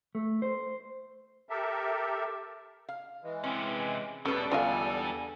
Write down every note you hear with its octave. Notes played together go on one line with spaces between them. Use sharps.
A3
C5
G4 A4 A#4 E5
F5
E3 G#3
C3 C4 C#4
E2 B2 G3 A3 C#4 A4 B4
G#2 D3 B3 F4 D#5 F5 G#5